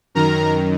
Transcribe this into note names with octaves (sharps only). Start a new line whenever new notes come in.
F#2 D#3 A#4 A#5